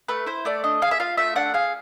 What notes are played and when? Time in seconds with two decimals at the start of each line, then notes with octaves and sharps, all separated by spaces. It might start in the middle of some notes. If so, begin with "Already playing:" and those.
0.08 A3 B4
0.26 E4 C5
0.45 A3 D5
0.64 D4 D#5
0.82 G#4 F5
0.91 E5
1.00 F4 F5
1.18 A3 E5
1.36 D4 F#5
1.54 G#4 F5